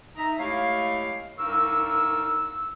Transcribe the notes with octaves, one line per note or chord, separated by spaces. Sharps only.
D#4 E5 A#5
G#3 A3 E4 G4 C#5 F5
C2 G2 D#4 A#4 C#6 E6